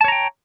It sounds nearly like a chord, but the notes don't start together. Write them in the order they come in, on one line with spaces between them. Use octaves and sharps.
A5 C#5 A#5 G5